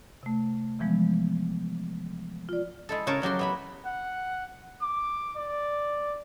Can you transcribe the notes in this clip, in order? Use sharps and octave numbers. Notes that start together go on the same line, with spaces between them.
C3 A3
C3 E3 F3 G#3 B3
F4 D5
G#3 E4 A4
C#3 A#4 C#5 A5
C#3 F#3 G4 C6
B3 E4 B5
F#5
D6
D5